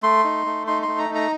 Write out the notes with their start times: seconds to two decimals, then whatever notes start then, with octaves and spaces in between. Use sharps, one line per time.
0.03 A3 C6
0.24 D#4
0.46 A3
0.67 D#4 C6
0.82 C6
0.88 A3
0.98 A#5
1.09 D#4
1.15 A#5